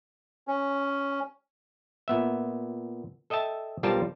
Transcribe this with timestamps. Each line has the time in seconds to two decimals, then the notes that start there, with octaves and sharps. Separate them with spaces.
0.47 C#4
2.08 A#2 B3 E5
3.30 A4 D#5 E5 G5 A5
3.83 B1 G3 F4 A#4 C5 A5